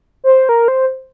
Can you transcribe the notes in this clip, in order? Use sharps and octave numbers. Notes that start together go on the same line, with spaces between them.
C5
A#4
C5